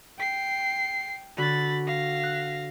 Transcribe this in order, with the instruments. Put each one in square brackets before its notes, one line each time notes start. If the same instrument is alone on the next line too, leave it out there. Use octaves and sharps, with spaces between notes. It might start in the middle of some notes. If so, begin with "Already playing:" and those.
[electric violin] G5 C7
[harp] D3 F#4 [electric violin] B5 A6
[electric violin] F5 A#6
[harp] F#6